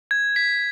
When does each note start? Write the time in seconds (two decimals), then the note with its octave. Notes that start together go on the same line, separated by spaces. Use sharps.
0.11 G#6
0.36 B6